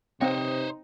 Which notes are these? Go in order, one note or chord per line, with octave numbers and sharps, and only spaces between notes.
C3 C4 D#4 C5 C#5 G5